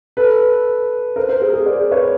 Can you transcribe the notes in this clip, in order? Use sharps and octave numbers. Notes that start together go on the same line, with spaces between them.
A4 B4
A#4 C5
A#4 C5
G#4 A#4
G#4 A#4
C5 D5
B4 C#5